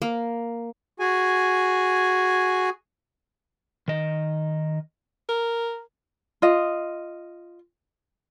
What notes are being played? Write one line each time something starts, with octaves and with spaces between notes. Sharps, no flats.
A#3
F#4 G#4 G#5
D#3 D#5
A#4
F4 D#5